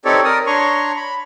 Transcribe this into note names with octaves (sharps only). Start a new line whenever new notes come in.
C4 D#4 G4 A4 C#5 D5
A#4 D5 D#6
D4 C#5 A#5 C6 C#6
B5